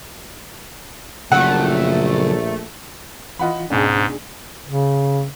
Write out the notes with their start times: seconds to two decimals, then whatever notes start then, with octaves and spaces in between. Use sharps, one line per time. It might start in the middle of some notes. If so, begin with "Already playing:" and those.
1.32 A#1 A#2 C#3 F#3 A3 F#5
3.39 E3 F4 D#5 F#5 B5
3.70 C#2 G#2 B2 D4 G#4
4.66 C#3